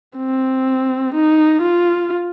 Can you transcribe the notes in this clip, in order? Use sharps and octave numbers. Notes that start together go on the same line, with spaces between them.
C4
D#4
F4